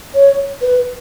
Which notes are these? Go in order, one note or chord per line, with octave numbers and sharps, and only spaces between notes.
C#5
B4